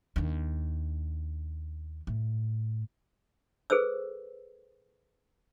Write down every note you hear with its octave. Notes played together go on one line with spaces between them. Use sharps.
D#2 D4
A2
G#4 A4 B4 C5 E6